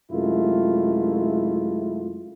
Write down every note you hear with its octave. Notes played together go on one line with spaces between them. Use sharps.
F#2 C3 G#3 A3 E4 F4